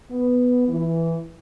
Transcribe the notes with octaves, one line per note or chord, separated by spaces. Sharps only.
B3
E3